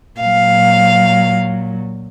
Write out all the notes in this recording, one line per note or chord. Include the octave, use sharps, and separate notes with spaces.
A#2 F#3 F5